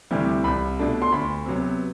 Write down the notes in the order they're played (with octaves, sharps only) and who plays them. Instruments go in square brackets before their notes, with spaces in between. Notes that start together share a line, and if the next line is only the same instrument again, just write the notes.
[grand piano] D2 C3 E3 G3
C2 B5
B2 A3 D4
C6
D2 B5
C3 F#3 B3